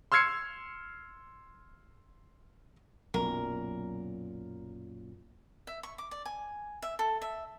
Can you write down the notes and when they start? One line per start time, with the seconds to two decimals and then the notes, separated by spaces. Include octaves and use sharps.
0.12 C6 E6 F6 G#6 C7 C#7
3.14 B1 F#2 A#2 A#4
5.67 E5
5.83 C#6
5.98 D6
6.11 D5
6.26 G#5
6.82 E5
6.99 A4
7.22 E5